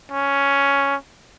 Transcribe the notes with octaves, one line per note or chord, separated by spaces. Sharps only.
C#4